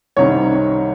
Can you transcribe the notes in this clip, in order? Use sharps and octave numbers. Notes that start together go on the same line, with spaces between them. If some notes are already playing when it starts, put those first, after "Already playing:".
C2 C3 D#3 G3 C#5